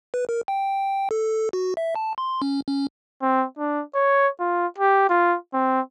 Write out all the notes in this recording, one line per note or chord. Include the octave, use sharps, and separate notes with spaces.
B4
A#4
G5
A4
F#4
E5
A5
C6
C#4
C#4
C4
D4
C#5
F4
G4
F4
C4